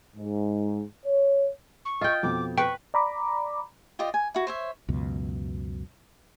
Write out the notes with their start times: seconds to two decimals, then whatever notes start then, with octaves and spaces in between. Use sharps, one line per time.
0.16 G#2
1.05 C#5
1.85 C#6
2.01 F4 D#5 G5
2.23 F2 B2 D6
2.58 B4 G5 C#6
2.94 D5 A#5 B5 D6
3.99 F4 G4 D5 D#5
4.14 G#5
4.34 E4 F#4
4.47 C5 C#5 E5
4.89 C#2 F#2 B2